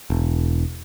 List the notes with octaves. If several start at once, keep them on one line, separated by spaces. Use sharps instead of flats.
E1